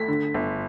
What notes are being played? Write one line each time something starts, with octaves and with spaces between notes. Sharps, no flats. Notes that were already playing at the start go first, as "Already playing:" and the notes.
Already playing: A3 B6
D3
G1